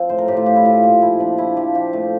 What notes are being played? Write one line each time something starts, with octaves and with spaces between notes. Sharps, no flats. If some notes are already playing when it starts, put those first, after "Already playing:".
Already playing: F3 C4
A2 C5
A#4
A2 G4
F4
F3 G4
E4
F3 F4
A#2
F3 E4
F3 D4
A#2 E4
F3 G4
F3 G4
A#2 A3